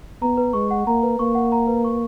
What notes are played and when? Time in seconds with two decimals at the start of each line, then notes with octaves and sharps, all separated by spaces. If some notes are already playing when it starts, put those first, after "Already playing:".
0.22 B3 A#5
0.37 B4
0.53 G#3 C#6
0.71 F#5
0.87 A#3 A#5
1.03 B4
1.19 A#3 C#6
1.35 F#5
1.52 A#5
1.67 B4
1.84 C#6